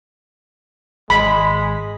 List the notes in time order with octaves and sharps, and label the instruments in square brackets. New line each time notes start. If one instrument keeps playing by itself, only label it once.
[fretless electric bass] G#1 [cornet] G#3 [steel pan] B5